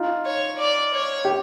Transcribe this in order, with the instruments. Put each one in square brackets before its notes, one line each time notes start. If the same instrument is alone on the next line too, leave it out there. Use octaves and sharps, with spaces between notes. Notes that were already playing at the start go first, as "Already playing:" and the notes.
Already playing: [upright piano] D#4 F4
[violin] C#5
D5
C#5
[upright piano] G4